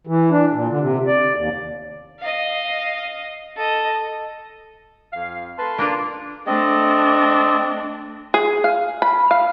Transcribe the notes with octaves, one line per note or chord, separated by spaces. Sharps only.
E3
D4
A#2
D3
C3
D5
D#2
D#5 F5
A4 D#5
F2 F5
A3 B4 A5 C6
A#3 D4 F4
A3 C4 D4 D#5
G#4
F5
B5
F5